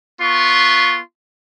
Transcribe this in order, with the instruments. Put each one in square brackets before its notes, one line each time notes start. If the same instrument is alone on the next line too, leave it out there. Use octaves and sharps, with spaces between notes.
[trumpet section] B3 F4 C6 C#6